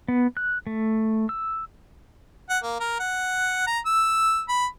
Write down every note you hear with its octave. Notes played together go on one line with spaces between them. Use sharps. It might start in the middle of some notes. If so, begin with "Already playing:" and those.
B3
F#6
A3
E6
F#5
A#3
A#4
F#5
A#5
E6
B5